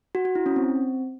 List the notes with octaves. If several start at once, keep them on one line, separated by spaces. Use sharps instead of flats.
F#4
F#4
E4
C#4
C4